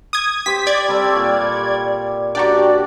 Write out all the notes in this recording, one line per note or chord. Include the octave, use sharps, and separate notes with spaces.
D#6 G#6
G4 C5 B6
D5 G#6
G3 C4 A4
A#2 C#6
D4 F#4 G4 D5 A#5